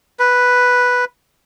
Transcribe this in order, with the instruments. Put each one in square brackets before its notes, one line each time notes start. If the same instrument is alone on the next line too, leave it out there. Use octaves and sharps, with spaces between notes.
[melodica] B4